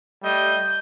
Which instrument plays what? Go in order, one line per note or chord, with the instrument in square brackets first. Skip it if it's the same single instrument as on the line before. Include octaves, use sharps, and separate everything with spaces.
[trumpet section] G3 A3 D#5 [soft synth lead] G6